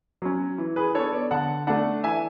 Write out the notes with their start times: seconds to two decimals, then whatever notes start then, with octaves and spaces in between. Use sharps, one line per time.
0.22 F#3 C#4
0.58 E3
0.76 G#4 B4
0.95 B3 D4 A4 C#5
1.13 B4 D5
1.31 D3 F#5 A5
1.67 A3 D4 F#5 A5
2.04 E3 E5 G#5